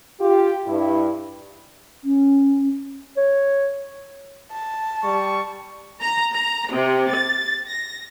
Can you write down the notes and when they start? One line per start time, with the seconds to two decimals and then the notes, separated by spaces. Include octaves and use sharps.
0.21 F4 G4
0.66 G2 E4
2.04 C#4
3.17 C#5
4.51 A5
5.04 G3 C#6
6.01 A#5
6.33 A#5
6.72 C3
7.11 A6
7.68 A#6